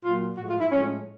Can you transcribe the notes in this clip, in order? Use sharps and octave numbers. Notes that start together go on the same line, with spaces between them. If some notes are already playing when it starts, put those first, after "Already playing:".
A#2 F#3 F4
A2 F3 G#3 F#4
F4
E4
A2 F3 G#3 C#4